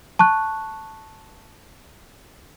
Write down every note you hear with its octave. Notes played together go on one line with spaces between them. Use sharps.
A5 C#6 F#6